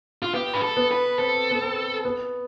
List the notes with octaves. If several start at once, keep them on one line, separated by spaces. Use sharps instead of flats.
F4
B3 G4
B4
A4
B3
B4
C4 A4
B3
C4
B3